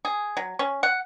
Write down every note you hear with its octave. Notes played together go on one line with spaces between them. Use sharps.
G#4
F#3
C#4
F#5